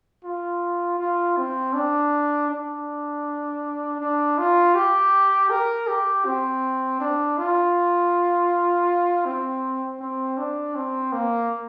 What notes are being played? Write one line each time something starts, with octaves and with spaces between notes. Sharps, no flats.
F4
F4
C4
D4
D4
D4
F4
G4
A#4
G4
C4
D4
F4
C4
C4
D4
C4
A#3